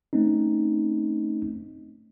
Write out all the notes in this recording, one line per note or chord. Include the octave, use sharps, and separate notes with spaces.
A3 C4 C#4 D#4